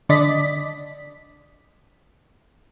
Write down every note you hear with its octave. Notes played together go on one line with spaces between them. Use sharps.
D3 D5 D#5 B6